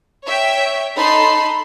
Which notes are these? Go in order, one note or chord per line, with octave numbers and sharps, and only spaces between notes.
C#5 E5 G5
D#4 A4 B5 C6